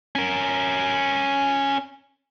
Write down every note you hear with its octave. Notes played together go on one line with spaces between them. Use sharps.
C#4 A#4